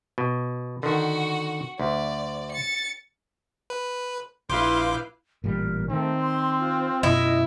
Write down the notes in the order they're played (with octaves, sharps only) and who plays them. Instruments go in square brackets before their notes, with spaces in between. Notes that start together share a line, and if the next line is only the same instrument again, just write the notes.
[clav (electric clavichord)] B2
[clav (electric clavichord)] D3 D#3 [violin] F#4 F#5
[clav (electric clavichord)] D2 [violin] D5
[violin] A6 C#7
[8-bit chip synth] B4
[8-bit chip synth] A#1 D6 G6 [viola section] E4 B4 F5 [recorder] C6
[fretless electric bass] A1 A#2 G3 [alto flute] A#4
[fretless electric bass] D#3 [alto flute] A3 [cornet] C4
[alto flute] C6
F4
[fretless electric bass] F#2 B2 [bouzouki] E4 [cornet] D#5